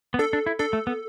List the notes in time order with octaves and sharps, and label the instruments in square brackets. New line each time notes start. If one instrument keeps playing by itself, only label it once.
[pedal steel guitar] B3
[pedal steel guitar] D4 [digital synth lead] A4
[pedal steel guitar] D4
E4
[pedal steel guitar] D4 [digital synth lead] A4
[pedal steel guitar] A3
B3